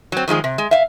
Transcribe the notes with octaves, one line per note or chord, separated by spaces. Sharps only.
F#3 C4
D#3 F3 G#3 G#4
C3
G#3
E5 F5